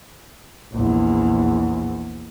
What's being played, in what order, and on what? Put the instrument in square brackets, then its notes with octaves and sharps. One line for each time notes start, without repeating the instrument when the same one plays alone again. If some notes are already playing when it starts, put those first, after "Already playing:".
[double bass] A#1 E2